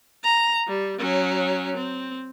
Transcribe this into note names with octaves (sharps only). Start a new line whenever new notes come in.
A#5
G3
F#3 C#4
C4